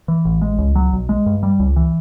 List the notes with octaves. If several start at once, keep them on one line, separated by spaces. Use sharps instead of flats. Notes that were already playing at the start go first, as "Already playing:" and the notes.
E3
A1
G#3
C#2
F#3
B1
G#3
G2
G3
C#2
E3